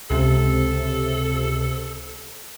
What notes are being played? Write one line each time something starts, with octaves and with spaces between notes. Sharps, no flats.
C#2 C3 A4